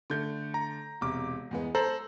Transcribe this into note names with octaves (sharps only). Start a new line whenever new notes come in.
D3 A3 G6
A#5
E1 C3 D6
E2 G#3 B3
A4 C5 A#5 F#7